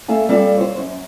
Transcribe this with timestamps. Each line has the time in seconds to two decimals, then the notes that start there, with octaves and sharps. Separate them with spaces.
0.08 A3 A4 F5 G#5
0.29 G3 C4 F4 A4 D5 F5
0.57 C5 C#5
0.78 F#2